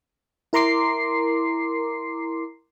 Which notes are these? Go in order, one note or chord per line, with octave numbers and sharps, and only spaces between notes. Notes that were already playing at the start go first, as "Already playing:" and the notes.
E4 A#4 A#5 C6 D6 C7